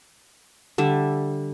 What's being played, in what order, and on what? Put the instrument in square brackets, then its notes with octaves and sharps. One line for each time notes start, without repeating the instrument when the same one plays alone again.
[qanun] D3 G3 E5